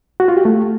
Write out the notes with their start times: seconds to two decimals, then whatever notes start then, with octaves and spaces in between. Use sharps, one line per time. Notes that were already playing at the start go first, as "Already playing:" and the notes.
0.20 F#4
0.28 F4
0.37 G4
0.45 A3